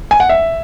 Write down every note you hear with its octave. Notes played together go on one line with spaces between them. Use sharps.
G#5
F#5
E5